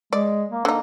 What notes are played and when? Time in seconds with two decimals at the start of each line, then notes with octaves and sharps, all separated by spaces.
0.13 G#3 D5
0.51 A#3
0.65 D3 A#3 D#4